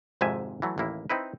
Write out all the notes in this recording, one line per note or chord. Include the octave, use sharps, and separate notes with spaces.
G#1 F2 G#2 C3 E5 G#5
E3 F#3 A3
A1 D#2 A#3 E4
C4 D#4 E4 B4